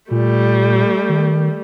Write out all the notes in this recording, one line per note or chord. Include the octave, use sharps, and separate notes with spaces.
A#2 G3 A3
D#3